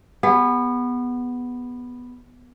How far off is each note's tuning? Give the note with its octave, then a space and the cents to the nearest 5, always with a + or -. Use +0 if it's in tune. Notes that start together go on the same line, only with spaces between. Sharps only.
B3 +0 G#4 -35